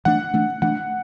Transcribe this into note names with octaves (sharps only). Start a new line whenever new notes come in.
E3 A3 D4 F#5
E3 A3 D4
E3 A3 D4 F#5